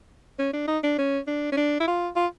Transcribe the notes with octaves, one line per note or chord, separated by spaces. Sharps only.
C#4
D4
D#4
D4
C#4
D4
C#4
D4
E4
F4
F4